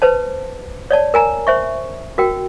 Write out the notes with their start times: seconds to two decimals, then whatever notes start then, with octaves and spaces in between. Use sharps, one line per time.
0.02 B4 C5 A5
0.91 C#5 D5 A5
1.14 A#4 G#5 A#5
1.47 C5 E5 C#6
2.18 F#4 A#4 G5